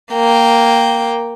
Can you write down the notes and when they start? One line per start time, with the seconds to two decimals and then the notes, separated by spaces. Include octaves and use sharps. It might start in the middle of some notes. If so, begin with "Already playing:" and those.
0.13 A#3 G5